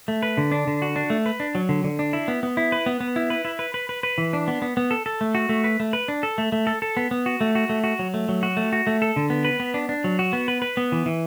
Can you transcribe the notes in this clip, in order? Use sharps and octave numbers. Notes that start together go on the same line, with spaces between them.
A3
B4
D3
D4
D3
F#4
D4
A3
B4
D4
F#3
D3
D3
D4
E4
B3
B3
E4
B4
B3
B3
E4
B4
E4
B4
B4
B4
B4
E3
D4
B3
B3
B3
A4
A4
A3
F#4
A3
B4
A3
B4
D4
A4
A3
A3
A4
A4
B3
B3
F#4
A3
F#4
A3
F#4
F#3
A3
F#3
F#4
A3
F#4
A3
A4
D3
B3
B4
B3
D4
D4
F#3
F#4
B3
B4
B4
B3
E3
E3